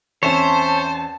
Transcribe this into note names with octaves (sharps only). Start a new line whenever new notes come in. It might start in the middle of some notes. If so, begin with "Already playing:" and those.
E2 C4 C#4 C5 C#5 E5 A5